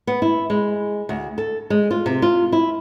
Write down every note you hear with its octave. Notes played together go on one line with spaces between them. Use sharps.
B3
E4
G#3
D2
A4
G#3
F4
C3
F4
E4